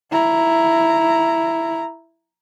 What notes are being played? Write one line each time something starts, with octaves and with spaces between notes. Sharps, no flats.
E4 A#5